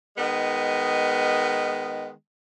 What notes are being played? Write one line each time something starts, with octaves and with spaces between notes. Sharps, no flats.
D#3 G#3 B3